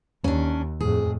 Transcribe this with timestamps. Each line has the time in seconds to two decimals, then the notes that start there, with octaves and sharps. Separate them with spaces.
0.24 D#2 C#4 D4
0.80 F2 A2 G#4